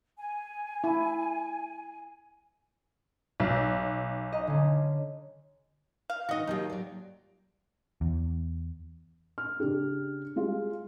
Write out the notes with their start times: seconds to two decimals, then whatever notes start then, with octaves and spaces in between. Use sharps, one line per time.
0.18 G#5
0.84 E4
3.40 B1 E6 F#6
4.32 D#5 A#5
4.47 D3 C#4
6.10 F5
6.29 D#3 D#4 F#4 D#5
6.47 D#2 F#3 D#4 F4 G4
6.70 F#3 D5
8.01 E2
9.38 F6
9.60 C#3 D4 G4
10.36 G3 G#3 F4